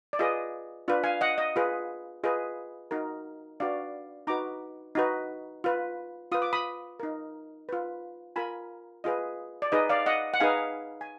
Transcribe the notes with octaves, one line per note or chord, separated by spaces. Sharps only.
D5
F4 G#4 B4 D#5
D4 F4 B4
F5 G#5
D#5 F#5
D#5
F4 G#4 B4
F4 G#4 B4 D#5
D#4 F#4 A#4
D4 F#4 B4 D5 F5
D#4 F#4 B4 A#5 D6
D#4 F#4 B4
F4 B4
F4 B4 D#6
D6
B5 D#6
D#4 A#4
F4 B4
F4 A#4 G#5 B5
F4 G#4 B4 D#5
D5
D#4 G#4 B4 D#5
D5 F5
D#5 F#5
F#5
D#4 G#4 B4 F5 G#5
G#5